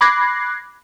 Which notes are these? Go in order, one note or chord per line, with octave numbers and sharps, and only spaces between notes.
B5 D6 F#6 G#6 A#6 C7